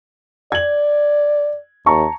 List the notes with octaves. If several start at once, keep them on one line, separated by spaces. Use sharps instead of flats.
D5 G#6 F#7
D#2 A5 A#5 C#6